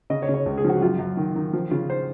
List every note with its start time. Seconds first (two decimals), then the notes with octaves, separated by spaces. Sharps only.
0.10 C#3 D#5
0.22 C#5
0.29 C#3
0.34 C#5
0.46 C#2
0.57 G#4
0.64 F3 F#4
0.82 F#2 F4
0.99 F#2
1.17 D#3
1.36 D#3
1.53 F3
1.71 C#3 F4
1.90 C5